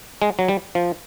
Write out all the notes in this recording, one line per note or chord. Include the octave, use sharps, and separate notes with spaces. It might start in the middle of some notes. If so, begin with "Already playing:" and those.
G#3
F#3
G3
F3